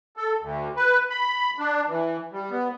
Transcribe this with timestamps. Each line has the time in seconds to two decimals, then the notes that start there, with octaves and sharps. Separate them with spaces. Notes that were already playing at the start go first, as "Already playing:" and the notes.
0.17 A4
0.41 D2
0.76 B4
1.10 B5
1.58 D4
1.88 E3
2.32 G3
2.51 B3